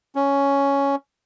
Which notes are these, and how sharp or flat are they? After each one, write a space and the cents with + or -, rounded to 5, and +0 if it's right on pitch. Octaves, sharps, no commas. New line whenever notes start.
C#4 +5